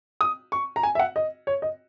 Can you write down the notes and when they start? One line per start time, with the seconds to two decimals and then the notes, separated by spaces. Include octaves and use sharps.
0.21 D#6
0.52 C#6
0.76 A#5
0.83 G#5
0.95 E5
0.99 F#5
1.16 D#5
1.47 C#5
1.62 D#5